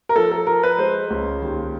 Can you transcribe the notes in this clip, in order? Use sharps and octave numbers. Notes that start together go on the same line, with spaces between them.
A#4
F3 A4
A4
F3 A#4
B4
G#3 C5
C#2
D#2